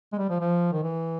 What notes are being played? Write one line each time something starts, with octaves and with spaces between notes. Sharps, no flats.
G#3
G3
F3
F3
D#3
E3